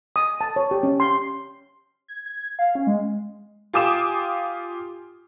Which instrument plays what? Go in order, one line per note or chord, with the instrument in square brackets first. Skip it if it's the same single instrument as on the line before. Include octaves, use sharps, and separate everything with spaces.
[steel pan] D#6
A5
C#5
G4
C#4
C6
[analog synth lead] G#6
G#6
F5
C#4
G#3
[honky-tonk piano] F4 G4 G#5 D6 D#6 E7